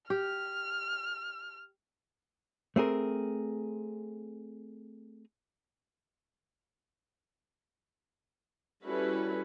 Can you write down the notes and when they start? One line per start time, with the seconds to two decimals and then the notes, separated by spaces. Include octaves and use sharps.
0.10 G4 F6
2.76 A3 C4 G#4 A#4
8.83 G3 C#4 E4 F#4 A4 B4